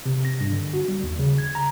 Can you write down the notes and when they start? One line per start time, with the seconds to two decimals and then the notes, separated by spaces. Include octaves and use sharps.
0.06 C3
0.25 A#6
0.41 G2
0.52 D3
0.73 F#4
0.88 G3
1.03 D#2
1.19 C#3
1.38 G#6
1.55 A#5